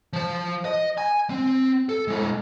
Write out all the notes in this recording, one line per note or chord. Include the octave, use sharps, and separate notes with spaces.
F3 C5
D#5
G#5
C4
A4
G#3 E4